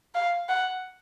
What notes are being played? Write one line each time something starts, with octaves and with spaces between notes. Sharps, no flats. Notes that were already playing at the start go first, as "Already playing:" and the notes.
F5
F#5